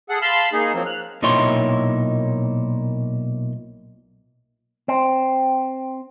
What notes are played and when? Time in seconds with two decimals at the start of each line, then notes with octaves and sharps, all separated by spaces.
0.09 G#4 A4 F#5
0.22 F5 A5 B5 C6
0.53 A#3 D#4 G#4
0.74 F3 F#3 A#3 C4
0.86 F6 F#6
1.22 B1 A#2 D#4 E4 C#5 C6
4.88 C4